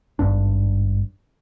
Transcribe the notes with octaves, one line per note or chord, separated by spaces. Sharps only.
G#1 G2 D4